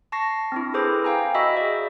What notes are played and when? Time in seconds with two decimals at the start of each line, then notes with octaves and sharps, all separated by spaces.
0.12 A5 C#6 A#6 C7
0.52 C4 D4 E4
0.74 G#4 A4 B4 C5 D6
1.04 F5 G5 G#5 A#5
1.35 F#4 D#5 E5 B5 E6
1.57 G#4 D5